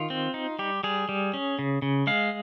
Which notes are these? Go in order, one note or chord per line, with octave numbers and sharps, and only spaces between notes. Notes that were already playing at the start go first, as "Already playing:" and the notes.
Already playing: D#3 F4
C4
D#4
G3 G4
G3 G#4
G3
C#4
C#3
C#3
G#3 F5